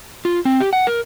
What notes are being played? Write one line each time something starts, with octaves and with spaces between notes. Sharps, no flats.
F4
C4
G4
F#5
A#4